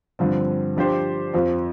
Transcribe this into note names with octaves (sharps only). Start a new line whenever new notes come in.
G2 D3 F3 C4
F3 D4 G4 C5
F2 F3 C4